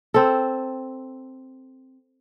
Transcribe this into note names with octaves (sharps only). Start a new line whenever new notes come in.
C4 A4